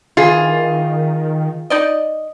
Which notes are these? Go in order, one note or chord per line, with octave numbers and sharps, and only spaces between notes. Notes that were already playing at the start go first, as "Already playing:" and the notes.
D#3 E3 F4 G#4
D#4 D5 D#5